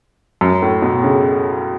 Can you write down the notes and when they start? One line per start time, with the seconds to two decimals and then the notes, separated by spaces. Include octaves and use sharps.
0.41 F#2
0.62 A2
0.82 B2
1.04 C#3